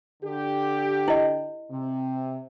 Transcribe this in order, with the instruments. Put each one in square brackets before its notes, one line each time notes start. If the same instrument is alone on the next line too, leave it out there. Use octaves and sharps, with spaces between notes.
[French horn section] D3 G4
[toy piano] E4 D#5
[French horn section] C3